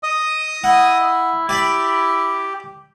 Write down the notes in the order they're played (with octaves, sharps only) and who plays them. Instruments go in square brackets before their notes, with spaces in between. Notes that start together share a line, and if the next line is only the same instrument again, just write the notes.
[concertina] D#5 D#6
[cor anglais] E4 [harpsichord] F#5
[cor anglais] E4 [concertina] G4 [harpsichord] D5 B5